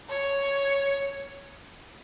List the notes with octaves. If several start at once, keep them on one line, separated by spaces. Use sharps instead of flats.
C#5